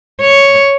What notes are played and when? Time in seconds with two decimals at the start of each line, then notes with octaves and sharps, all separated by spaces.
0.21 C#5